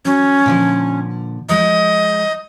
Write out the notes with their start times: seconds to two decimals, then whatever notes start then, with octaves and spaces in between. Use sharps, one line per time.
0.05 F#3 C#4
0.46 A#2 D3 F3
1.49 F3 G#3 D#5